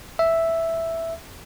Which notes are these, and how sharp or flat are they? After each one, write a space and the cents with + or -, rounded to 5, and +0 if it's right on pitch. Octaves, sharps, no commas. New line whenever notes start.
E5 +0